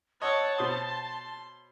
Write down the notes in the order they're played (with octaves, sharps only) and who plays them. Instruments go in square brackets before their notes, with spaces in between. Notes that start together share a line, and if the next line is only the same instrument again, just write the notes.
[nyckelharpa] C#5 F#5 [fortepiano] D#5 E6 [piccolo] A5
[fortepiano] B2 C5 D#6 [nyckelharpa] C6